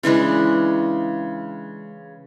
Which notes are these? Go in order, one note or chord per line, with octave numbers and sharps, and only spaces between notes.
C#3 E3 G#3 D4